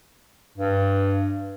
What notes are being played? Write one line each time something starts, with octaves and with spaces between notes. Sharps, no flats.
G2